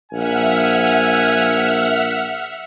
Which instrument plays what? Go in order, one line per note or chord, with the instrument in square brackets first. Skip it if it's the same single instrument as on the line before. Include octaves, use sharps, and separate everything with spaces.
[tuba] A#1 [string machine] E5 F#5 F6 [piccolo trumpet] G#5